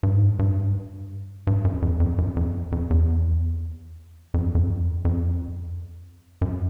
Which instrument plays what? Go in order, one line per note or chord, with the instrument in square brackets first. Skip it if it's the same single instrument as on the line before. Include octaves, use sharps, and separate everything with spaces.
[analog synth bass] G2
G#2
G2
G2
G2
F#2
F2
F2
F#2
F2
F2
E2
F2
F#2
F2
F2
F#2